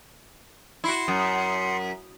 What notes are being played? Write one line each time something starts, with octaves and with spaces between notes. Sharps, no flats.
E4 F#4 C6 C7 C#7
F#2